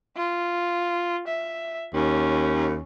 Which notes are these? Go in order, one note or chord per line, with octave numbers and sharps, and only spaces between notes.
F4
E5
D#2 C#4